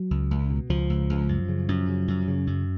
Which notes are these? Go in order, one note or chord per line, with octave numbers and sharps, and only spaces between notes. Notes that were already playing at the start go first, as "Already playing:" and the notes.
Already playing: F#3
C#2
C#2
B2
C#2 F3
C#2
C#2
F#2
C#3
F#2
C#3
F#2
C#3
F#2